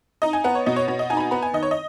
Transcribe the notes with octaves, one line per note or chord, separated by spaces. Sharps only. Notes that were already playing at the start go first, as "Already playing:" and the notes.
D#4 D#5
G#5
B3 F#5
C#5
B2 D#5
C#5
B2 C#5
D#5
D#4 G#5
B5
G#5
B3 B5
G#5
D#3 D#5
C#5
D#5